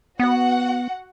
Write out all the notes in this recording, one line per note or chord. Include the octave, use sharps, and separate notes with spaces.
B3 F#4 F#5